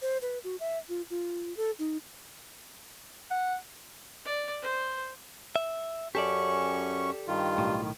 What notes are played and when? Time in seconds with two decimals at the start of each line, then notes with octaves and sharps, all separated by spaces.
0.02 C5
0.22 B4
0.44 F#4
0.60 E5
0.89 F4
1.10 F4
1.57 A4
1.79 D#4
3.31 F#5
4.25 D5
4.63 C5
5.56 E5
6.15 F#2 C#4 G4 A4 D5 C#6
7.28 G2 D#3 F4
7.58 B1 A2
7.82 D#3